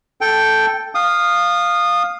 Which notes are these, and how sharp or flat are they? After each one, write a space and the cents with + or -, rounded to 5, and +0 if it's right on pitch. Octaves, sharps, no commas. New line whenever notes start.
A4 +0 G5 +0
F5 +5 D#6 -20